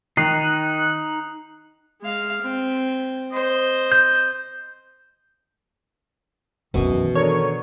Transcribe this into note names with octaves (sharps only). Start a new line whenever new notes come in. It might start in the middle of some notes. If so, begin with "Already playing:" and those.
D#3 D#4 F#6 C7
G#3 F5
C4
C5 D#5
G6
F#2 B2 D#3 E3
D4 A4 A#4 C#5